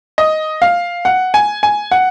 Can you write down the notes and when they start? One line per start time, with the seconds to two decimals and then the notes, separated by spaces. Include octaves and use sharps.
0.18 D#5
0.62 F5
1.05 F#5
1.34 G#5
1.63 G#5
1.91 F#5